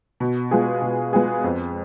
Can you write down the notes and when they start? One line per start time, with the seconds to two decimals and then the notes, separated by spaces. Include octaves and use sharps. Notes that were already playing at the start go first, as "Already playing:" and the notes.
0.20 B2
0.51 G#3 B3 F4 G#4
0.82 B2
1.13 G#3 B3 F4 G#4
1.44 F2